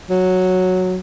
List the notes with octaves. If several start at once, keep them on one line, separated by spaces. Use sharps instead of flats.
F#3